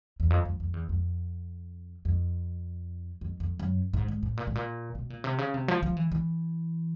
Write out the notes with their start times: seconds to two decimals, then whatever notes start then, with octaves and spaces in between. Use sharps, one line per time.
0.20 E2
0.30 F2
0.45 F2
0.60 F2
0.74 E2
0.89 F2
2.05 F2
3.21 F2
3.40 F2
3.59 F#2
3.93 G#2
4.08 G#2
4.23 A2
4.37 A#2
4.47 A2
4.55 A#2
4.95 B2
5.10 A#2
5.24 C3
5.38 C#3
5.54 C3
5.68 F3
5.83 F3
5.97 E3
6.12 E3